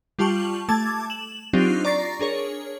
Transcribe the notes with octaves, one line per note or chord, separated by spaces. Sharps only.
G3 F4 G4 A5 C#6 F#7
A3 A5 D6 G#6 A6
E7 F#7
F#3 C4 D4 D#4 F4 G4
D5 A#5 C#6 A6 A#6 C7
D4 G#4 A#4 C#5